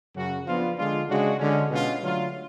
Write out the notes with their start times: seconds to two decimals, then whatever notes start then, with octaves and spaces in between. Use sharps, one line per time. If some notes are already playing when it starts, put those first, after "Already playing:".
0.15 F#2 C#3 F#3 C#4 F#4
0.46 F3 B3 D4 F4
0.78 D3 G#3 D4 F4
1.09 C#3 G#3 D4 F#4
1.39 D3 G#3 C#4
1.70 B2 G#3 C#4 F4
2.02 D3 F#3 A3 F4